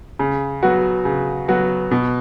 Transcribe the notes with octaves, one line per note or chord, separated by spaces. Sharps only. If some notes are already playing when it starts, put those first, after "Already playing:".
C#3
F#3 B3 F#4
C#3
F#3 B3 F#4
B2